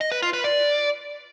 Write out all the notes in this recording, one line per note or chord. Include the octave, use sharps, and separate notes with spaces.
D#5
B4
F4
B4
D5